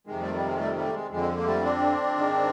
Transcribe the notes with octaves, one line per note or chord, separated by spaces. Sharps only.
F2 C3 D#3 G#3
G3 A3
G3
G#3
G3 A3
G3 A3
G#3
F2 D3 G#3
A#3
G3 A3
C4 D4
G#2 D#3